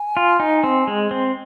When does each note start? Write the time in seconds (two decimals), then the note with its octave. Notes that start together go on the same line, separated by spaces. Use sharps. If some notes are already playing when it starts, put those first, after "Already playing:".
Already playing: G#5
0.17 F4
0.40 D#4
0.64 C4
0.87 G#3
1.11 C4